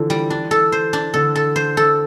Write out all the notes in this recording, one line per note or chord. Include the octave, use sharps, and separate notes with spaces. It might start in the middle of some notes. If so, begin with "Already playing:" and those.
Already playing: D3 E3 F3 A4
G3
D4
A4
C5
D4
D3 A4
A4
C5
A4